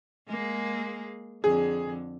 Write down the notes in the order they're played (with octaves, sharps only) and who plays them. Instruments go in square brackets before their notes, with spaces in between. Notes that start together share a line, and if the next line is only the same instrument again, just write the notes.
[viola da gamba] G#3 A#3 G#4
[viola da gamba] F2 D3 [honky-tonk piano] G#4